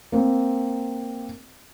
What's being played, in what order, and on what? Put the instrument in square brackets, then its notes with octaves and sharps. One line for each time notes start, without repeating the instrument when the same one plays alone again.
[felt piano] A#3 C4